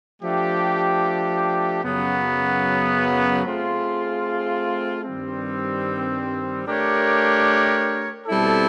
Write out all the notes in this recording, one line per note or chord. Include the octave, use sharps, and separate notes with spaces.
F3 A3 D4 G4
F#2 C#3 F#3 B3
A3 C4 F4 G#4
G2 D#3 G3 C4
A3 D4 G4 A#4 C#5
B2 G3 C4 E4 A4